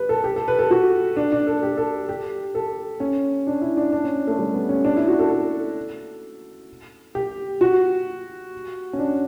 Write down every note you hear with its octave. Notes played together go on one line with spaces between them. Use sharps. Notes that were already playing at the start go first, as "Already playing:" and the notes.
Already playing: G4 B4
A4
G4
A4
B4
A4
F#4
D4
D4
A4
G4
A4
G4
A4
C#4
D4
E4
D4
D4
C#4
A3
G3
B3
C#4
D4
E4
F#4
A4
A4
G4
F#4
C#4
D4